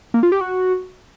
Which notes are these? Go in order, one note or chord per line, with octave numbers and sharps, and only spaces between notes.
A#3
F4
G4
F#4